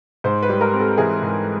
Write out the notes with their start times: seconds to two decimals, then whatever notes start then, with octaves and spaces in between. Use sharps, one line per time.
0.24 G#2 C5
0.43 B4
0.49 G3
0.61 A#4
0.73 C4
0.80 A4
0.98 E3 G#4
1.22 G#2